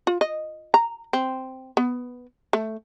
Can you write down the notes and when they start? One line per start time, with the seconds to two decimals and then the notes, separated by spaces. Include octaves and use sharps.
0.07 F4
0.21 D#5
0.74 A#5
1.13 C4
1.77 B3
2.53 A3